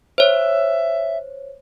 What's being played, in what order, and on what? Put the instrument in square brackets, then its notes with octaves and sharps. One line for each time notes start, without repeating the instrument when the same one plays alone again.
[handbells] C5 C#5 [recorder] E5